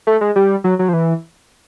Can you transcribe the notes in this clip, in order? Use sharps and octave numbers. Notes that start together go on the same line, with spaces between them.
A3
G#3
G3
F#3
F#3
F3
E3